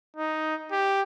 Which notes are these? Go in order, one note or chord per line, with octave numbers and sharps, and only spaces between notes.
D#4
G4